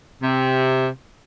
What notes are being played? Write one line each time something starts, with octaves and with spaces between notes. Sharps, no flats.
C3